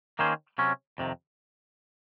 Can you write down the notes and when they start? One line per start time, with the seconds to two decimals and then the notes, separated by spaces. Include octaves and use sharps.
0.19 D#3 A#3 C#4 G#4 C5
0.58 C3 F#3 C#4
0.98 F2 C3 D#3